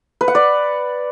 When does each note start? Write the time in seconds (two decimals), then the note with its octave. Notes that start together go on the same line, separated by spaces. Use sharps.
0.21 B4
0.28 F#5
0.35 D5